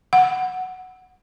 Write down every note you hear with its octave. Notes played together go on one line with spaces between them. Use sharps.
F#5